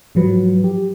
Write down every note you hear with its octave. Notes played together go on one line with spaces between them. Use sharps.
G#2 F3 F#3 B4
G4